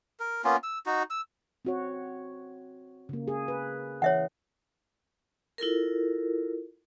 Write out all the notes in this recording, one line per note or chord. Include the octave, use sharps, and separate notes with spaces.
A#4
A#3 B3 C#4 F4
E6
D#4 F#4
E6
C4 F#4 C#5
C#3 A#3
G#4
B4
E3 C#5 E5 F#5
E4 F4 A4 A#4